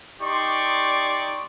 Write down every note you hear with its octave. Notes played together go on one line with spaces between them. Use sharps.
D#4 G4 D5 C6 C#6